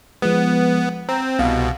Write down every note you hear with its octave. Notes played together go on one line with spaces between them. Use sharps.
F3 G#3 B3
C4 A#5
C2 B2 F5